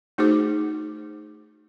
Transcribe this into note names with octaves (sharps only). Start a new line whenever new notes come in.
A3 D#4 F#4 G#4 C5 D6